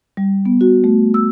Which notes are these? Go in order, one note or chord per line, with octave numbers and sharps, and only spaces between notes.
G3
B3
F#4
A3
E6